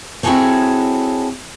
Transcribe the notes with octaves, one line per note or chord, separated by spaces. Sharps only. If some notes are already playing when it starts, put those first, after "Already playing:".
C4 E4 F#4 G#4 A4 C#5